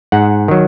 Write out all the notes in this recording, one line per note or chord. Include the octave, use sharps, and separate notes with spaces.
G#2 F#5
D#3 F#3